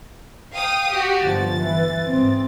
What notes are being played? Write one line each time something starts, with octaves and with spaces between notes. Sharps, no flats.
F5 G5 D#6
F#4 G4
G1 F3 A6
E3
G#2 C4